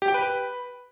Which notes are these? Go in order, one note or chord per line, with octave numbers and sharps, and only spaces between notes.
G4
G5
B4